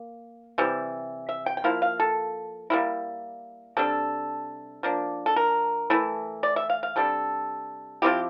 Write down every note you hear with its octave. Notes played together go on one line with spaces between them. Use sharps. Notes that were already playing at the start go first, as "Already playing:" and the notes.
Already playing: A#3
C3 E3 G3
E5
G5
G5
F3 A#3 E4 F5
F5
A4
G3 A#3 E4
C3 G3 D4 A4
F3 A#3 D4
A4
A#4
E3 A3 E4
D5
E5
F5
F5
C3 G3 D4 A4
F3 C4 E4 G4